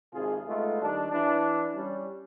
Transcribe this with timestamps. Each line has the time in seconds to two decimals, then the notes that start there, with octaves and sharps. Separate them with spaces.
0.14 G#1 C3 F4 G#4
0.48 G#3 A3 B3 D#4 F4
0.82 D#3 G3 D4
1.12 E3 D4
1.76 G3 C#4